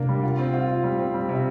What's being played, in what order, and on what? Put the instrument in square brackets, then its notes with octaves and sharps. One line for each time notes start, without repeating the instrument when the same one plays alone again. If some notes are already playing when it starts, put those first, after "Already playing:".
Already playing: [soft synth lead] C3 [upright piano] A#3 D4
[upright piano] G3
F4
C4
F4
F4
G3
C4
G3
C3